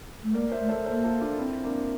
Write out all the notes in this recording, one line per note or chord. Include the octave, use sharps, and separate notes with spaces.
A3
A#3 A#4 D5
C5 E5
A3
A4 C5
A#3 A4 C5
F4 A4
D4 F4
C4 E4
A#3 D4